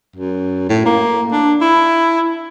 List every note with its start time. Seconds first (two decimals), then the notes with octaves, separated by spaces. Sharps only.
0.16 F#2
0.70 A2
0.86 A#3
1.32 D4
1.61 E4